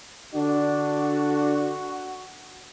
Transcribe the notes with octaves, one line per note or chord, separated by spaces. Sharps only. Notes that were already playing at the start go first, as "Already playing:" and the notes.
D3 D4 F#4